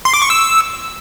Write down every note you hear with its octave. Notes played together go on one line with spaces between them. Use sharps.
C6
D6
C#6
E6